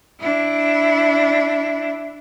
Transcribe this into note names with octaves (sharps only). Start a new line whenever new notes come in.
D4 E4